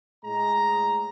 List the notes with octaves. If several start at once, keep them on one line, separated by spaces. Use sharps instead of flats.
A2 G#3 A#5